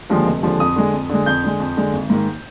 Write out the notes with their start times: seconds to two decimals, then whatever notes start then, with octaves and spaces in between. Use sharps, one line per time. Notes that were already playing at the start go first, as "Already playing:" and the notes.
0.10 D#2 D3 F3 G#3
0.26 F1
0.43 D#2 D3 F3 G#3
0.60 F2 D#6
0.76 D3 G#3
0.93 F2
1.10 D3 G#3
1.26 F2 G6
1.43 D3 G#3
1.60 F2
1.77 D3 G#3
1.93 G#1
2.10 G#2 D#3 A#3